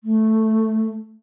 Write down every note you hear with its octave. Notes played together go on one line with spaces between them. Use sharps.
A3